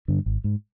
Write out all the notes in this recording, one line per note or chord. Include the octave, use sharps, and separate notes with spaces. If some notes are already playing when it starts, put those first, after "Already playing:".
G2 D3
G#1
G#2